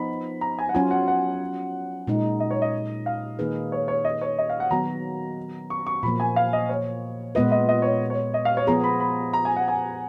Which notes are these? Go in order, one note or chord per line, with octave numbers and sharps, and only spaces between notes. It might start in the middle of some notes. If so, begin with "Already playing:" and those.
Already playing: F3 B3 D#4 B5
A#5
G#5
F#5
F#3 C#4 F4 G#5
F#5
F#5
A#2 G#3 D#4
D#5
C#5
D#5
F5
D#3 A#3 D#4 G#4 B4
C#5
C#5
D#5
C#5
D#5
F5
F#5
D#3 F#3 B3 F#4 A#5
C#6
C#6
A#2 F3 A#3 B5
G#5
F5
D#5
C#5
A#2 G#3 B3 F4 B4 D#5
D#5
D#5
C#5
C#5
D#5
F5
C#5
F3 B3 F4 G#4 A#5
B5
B5
A#5
G#5
F#5
G#5